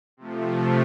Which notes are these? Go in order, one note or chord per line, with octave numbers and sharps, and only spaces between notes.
C3 F3 A3